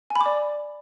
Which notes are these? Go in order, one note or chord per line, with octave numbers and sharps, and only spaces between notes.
G#5
B5
D6
D5